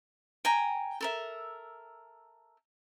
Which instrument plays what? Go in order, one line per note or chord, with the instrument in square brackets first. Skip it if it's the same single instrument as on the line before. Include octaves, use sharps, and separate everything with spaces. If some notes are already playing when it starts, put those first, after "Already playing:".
[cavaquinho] G5 G#5 A#5
A4 A#4 E5